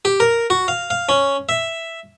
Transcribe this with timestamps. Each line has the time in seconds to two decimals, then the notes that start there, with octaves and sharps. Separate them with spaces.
0.05 G4
0.20 A#4
0.50 F#4
0.68 F5
0.90 F5
1.09 C#4
1.49 E5